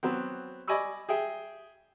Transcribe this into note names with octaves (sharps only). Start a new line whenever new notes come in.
F#3 B3 C4
D5 D#5 G#5 B5 C#6 E6
G#4 E5 G5